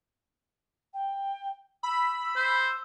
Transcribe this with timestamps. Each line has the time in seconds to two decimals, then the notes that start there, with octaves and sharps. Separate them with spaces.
0.93 G5
1.83 B5 E6
2.36 C5